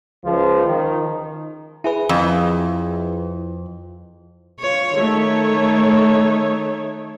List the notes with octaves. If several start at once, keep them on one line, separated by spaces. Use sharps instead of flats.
C#2 F3
D#3
E4 G#4 B4
F2
F4 C#5
D#3 A3 C#5